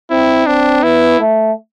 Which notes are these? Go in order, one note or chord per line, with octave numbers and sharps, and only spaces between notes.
C4 E4
C4 D4
B3 E4
A3